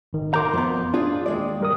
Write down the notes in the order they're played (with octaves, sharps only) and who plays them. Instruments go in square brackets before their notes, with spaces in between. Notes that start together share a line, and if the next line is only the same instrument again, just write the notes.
[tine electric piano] G#1 D#3
[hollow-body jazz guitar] A#4 A#5 [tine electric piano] C6 D6 G6
[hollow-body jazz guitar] F2 B3
D4 F4 G#4
D#2 G#3 D5
[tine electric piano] G3 A#4 D#6